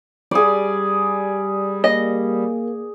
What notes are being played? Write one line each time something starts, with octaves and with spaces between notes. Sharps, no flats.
G3 G#4 D5
A#3 D#5